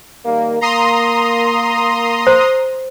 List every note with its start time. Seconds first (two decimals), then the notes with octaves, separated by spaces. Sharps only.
0.25 D#3 G3 A#3
0.61 A#3 A#5 C6 D#6
2.27 C5